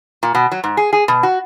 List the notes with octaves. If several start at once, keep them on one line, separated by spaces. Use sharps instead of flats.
A#2
B2
F#3
G#2
G#4
G#4
B2
F#4